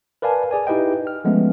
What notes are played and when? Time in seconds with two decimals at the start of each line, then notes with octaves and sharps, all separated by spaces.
0.22 A#4 B4 D5 F5 G#5 A5
0.51 G#4 D5 G#5
0.67 D#4 E4 G4 B4 D#5 G5
1.07 F6
1.24 F3 G#3 A3 B3 C#4